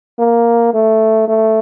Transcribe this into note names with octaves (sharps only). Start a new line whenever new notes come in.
A#3
A3
A3